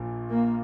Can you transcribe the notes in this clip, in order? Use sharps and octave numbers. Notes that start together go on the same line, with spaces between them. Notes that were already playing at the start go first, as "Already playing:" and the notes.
Already playing: A#1 A#2
A#3